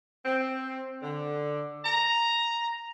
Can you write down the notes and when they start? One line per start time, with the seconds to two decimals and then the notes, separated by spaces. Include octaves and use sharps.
0.25 C4
1.02 D3
1.85 A#5